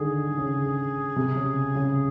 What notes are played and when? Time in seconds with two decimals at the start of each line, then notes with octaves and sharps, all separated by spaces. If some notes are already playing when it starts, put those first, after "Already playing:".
Already playing: D3 D#3 G#4
0.12 D3
0.38 C#3
1.16 C3
1.36 C#3
1.75 C#3